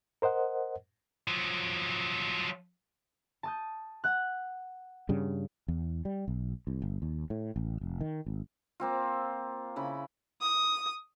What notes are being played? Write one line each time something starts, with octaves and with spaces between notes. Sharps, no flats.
A#4 C5 D#5 F#5
F3 F#3
A5 D#6 G6
F#5 F#6
G2 C#3 G3
E2
G3
B1
C2
G1
D#2
A2
A1
F1
D#3
G#1
A#3 C4 F4
C#3 E4 B5
D#6